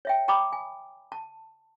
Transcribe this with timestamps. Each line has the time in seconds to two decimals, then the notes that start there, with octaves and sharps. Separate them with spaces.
0.05 C#5 E5 G5
0.28 G5 A#5 B5 D6 D#6
0.53 G#5
1.12 A5